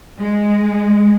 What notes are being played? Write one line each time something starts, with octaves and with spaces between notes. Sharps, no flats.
G#3